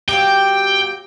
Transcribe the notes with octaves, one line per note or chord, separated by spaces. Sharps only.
F#3 A#3 G4 G5